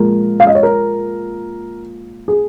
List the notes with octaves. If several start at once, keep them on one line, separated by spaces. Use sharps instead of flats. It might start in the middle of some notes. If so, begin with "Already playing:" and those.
Already playing: A#2 F3 G#3 A#4
F5
D#5
C#5
A#4
G#4